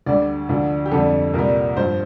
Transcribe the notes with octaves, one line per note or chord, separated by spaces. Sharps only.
D2 D3 G3 D5
D2 D3 F3
G4
F2 D3 G3 A4
C2 A#2 G3 A#4
G2 F3 C5